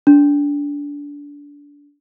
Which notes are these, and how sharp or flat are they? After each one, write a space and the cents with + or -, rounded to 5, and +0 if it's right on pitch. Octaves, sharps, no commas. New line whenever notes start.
D4 -25